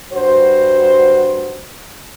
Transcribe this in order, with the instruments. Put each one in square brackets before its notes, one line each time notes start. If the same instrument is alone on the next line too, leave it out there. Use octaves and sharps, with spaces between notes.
[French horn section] G2 F#4 C5